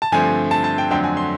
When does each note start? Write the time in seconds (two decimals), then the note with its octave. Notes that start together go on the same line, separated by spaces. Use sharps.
0.02 A5
0.12 G2 D3 F3 A3 C4 G#5
0.51 A5
0.64 A5
0.78 G5
0.90 F2 D3 F#3 A3 C4 G5
1.04 G#5
1.17 C6